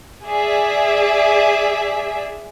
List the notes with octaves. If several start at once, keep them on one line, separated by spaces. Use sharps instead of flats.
G#4 D5 E5